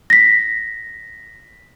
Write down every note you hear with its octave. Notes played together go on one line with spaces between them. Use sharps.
A#6 B6